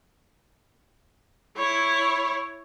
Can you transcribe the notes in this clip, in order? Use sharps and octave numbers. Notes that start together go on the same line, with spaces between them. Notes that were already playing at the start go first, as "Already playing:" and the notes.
E4 C#5